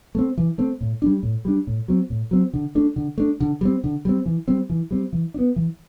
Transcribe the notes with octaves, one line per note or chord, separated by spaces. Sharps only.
A3 C4
E3
A3 C4
A2
G3 D4
A2
G3 D4
A2
F#3 C4
A2
F#3 C4
D3
A3 D4
D3
A3 D4
D3
G3 C4
D3
G3 C4
E3
G3 C4
E3
G3 C4
E3
D4
B3
E3